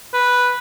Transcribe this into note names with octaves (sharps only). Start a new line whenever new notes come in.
B4